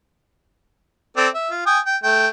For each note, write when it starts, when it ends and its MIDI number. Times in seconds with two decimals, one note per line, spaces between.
1.17 1.28 60
1.17 1.28 69
1.17 1.28 74
1.34 1.50 76
1.51 1.62 65
1.66 1.79 79
1.66 1.79 80
1.66 1.79 87
1.86 1.97 79
2.03 2.28 57
2.03 2.28 79